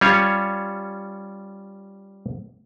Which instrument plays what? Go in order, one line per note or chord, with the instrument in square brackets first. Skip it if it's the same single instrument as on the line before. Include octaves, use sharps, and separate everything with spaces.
[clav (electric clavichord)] G3 C#4 F4 C#5